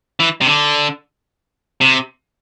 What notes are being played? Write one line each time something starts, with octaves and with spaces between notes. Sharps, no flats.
E3
C3
D3
C3